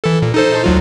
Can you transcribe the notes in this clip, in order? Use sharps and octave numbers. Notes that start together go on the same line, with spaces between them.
E3 A4
A#2
D#4 A4 C5
D2 F#3 F4